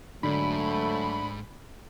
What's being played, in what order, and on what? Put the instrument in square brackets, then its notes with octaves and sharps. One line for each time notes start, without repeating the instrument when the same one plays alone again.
[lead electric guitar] G#2 [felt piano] D3 [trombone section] F#3 A3 [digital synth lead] B5